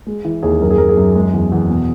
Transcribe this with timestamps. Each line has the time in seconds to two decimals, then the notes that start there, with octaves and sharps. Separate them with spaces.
0.07 G#3
0.25 E3
0.43 D#2 G#4
0.61 F#2 A#4
0.70 G#4
0.78 F#2 A#4
0.89 G#4
0.97 F#2
1.15 G#3
1.33 E2
1.52 E2
1.70 B2